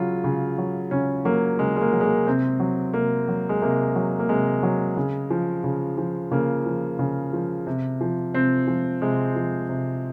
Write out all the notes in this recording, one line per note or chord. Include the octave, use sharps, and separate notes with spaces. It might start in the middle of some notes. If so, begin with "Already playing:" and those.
Already playing: C#3 F#3 F4
C#3
F#3
C#3 C#4
F#3 A#3
C#3 G#3
G#3
A#3
F#3
G#3
A#3
C3 C4
F#3
C3 A#3
F#3
G#3
C3 A#3
F#3
A#3
C3 G#3
F#3
C#3
F3
C#3
F3
C#3 A#3
F3
C#3
F3
C3
F3
C3 C4
F3
C3 G#3
F3
C3